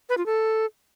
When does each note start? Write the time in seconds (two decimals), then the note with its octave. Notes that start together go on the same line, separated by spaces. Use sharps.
0.09 B4
0.18 F4
0.26 A4